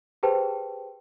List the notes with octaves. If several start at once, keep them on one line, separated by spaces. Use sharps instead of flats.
G4 G#4 B4 C5 G5 A5